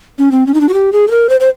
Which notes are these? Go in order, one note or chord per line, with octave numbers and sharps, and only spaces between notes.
C#4
C4
C#4
D#4
D4
F#4
G4
G#4
A4
A#4
C5
C5